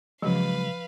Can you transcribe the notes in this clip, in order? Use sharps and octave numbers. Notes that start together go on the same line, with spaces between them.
C#3 F3 F#3 G#3 B4 F5